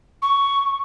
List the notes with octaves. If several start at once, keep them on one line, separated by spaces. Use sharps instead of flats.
C#6